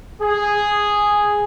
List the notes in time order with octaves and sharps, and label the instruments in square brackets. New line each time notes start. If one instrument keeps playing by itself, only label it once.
[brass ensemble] G#4